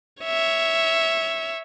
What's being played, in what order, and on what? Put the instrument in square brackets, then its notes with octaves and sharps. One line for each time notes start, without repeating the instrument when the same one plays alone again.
[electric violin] C#5 E5